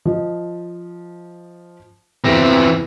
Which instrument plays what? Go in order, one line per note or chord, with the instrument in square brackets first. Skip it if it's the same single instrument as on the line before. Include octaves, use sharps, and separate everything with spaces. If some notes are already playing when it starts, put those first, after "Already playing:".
[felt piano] F3 D#5
[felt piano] E2 A#6 [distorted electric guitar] E3 C4